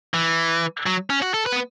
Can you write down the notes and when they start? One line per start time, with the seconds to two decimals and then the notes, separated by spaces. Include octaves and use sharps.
0.14 E3
0.86 F#3
1.10 C#4
1.22 F#4
1.34 A4
1.46 B4
1.53 B3